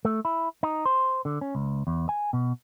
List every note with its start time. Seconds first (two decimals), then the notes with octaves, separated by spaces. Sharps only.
0.05 A3
0.25 E4
0.63 D#4
0.85 C5
1.25 D3
1.41 C#4
1.55 C#2
1.87 E2
2.09 G#5
2.33 B2